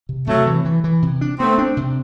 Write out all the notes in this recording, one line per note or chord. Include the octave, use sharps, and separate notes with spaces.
C3
C3 F#3 A3
E3
E3
E3
C3
D4
A3 B3 C4
D4
C3